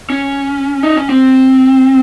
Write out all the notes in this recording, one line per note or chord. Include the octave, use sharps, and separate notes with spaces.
C#4
D#4
C#4
C4